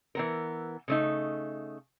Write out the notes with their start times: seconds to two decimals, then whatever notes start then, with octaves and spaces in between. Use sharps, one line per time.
0.15 E3 B3 A#4
0.88 C#3 A3 D#4